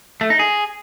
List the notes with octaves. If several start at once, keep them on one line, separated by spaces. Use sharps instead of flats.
A3
D#4
G#4